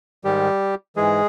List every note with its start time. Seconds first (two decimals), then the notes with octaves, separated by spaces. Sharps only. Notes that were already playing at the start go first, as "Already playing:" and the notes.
0.24 G#2 D#3 G3 G4
0.96 G#2 E3 G#3 G#4